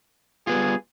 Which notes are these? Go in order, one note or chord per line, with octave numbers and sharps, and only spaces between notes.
G3 B3 F4 G#4